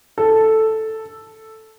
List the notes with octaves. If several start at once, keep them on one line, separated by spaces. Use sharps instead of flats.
A4